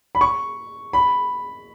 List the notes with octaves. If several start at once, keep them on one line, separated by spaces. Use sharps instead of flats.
B5
C#6
B5